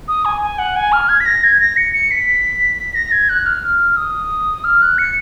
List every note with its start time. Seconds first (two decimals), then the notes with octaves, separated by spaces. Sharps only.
0.08 D#6
0.25 G#5
0.42 G#5
0.59 F#5
0.76 G#5
0.92 F6
1.09 G#6
1.20 B6
1.26 A#6
1.44 G#6
1.60 A#6
1.77 C#7
1.93 C#7
2.11 B6
2.95 A#6
3.12 G#6
3.29 F#6
3.46 F6
3.91 F6
3.97 D#6
4.64 F6
4.82 F#6
4.98 C#7